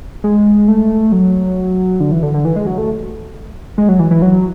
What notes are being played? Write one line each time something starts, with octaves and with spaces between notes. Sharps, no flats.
G#3
A3
F#3
D3
E3
D3
D3
E3
G#3
F#3
A3
G#3
F#3
E3
E3
F#3